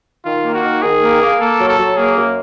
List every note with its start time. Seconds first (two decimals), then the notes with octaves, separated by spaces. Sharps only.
0.25 D#3 F4
0.44 A#3
0.54 F#4
0.63 D#3
0.82 D#3 G#4
1.01 A#3
1.20 A#3
1.40 A#3 A4
1.59 F#3
1.68 A4
1.78 F#3
1.97 A#3 G#4
2.16 F#2